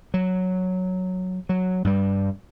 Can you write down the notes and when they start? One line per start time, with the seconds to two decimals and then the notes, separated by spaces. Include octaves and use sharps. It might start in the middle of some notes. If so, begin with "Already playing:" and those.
0.14 F#3
1.49 F#3
1.84 G2 G3